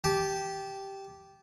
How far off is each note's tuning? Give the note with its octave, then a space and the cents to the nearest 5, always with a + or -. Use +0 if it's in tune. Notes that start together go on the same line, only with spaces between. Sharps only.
G4 -5 A5 -25